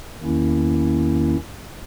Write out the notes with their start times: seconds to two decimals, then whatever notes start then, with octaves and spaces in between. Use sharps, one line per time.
0.19 E2 D#3 A#3 C#4 E4